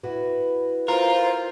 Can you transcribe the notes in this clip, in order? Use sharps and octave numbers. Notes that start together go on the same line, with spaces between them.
E4 F#4 B4
F4 A#4 C5